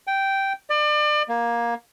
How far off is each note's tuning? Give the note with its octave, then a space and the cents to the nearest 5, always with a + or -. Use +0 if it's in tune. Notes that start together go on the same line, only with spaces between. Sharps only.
G5 -5
D5 +35
A#3 +15